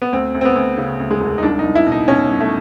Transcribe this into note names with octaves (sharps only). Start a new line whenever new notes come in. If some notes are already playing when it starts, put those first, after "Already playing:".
B3
D2 C4
D2
C4
B3
D2
C#3
D2
G#3
E1
D#4
C2 D4
D#4
C2
E4
B2
D#4
B2 C#4
C2
A3